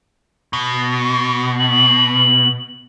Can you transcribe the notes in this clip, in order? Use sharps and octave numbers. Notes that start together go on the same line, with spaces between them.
B2
F#7